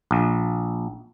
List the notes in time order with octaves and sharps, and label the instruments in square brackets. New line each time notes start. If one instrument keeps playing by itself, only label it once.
[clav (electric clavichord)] A#1